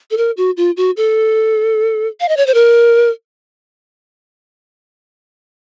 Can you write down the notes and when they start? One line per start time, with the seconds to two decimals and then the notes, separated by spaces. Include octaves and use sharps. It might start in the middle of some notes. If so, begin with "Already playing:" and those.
0.11 A4
0.17 A#4
0.37 F#4
0.57 F4
0.77 F#4
0.97 A4
2.20 F5
2.29 D#5
2.37 C#5
2.47 C5
2.54 A#4